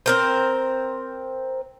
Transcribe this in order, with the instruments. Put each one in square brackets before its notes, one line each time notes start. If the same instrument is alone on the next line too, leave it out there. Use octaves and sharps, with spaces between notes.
[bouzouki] C4 A#4 C5